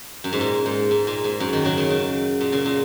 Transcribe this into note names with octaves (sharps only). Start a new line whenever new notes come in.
F#2
G#2
A#2
G#2
G#2
A#2
G#2
F#2
D#3
C#3 F#3
D#3
C#3
A#2
C#3
A#2